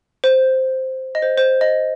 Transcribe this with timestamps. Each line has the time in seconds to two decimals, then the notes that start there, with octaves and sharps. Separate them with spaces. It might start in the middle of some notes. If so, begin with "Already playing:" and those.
0.24 C5
1.15 D#5
1.22 C5
1.38 C5
1.61 D#5